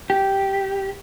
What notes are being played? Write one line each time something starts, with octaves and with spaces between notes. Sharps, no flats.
G4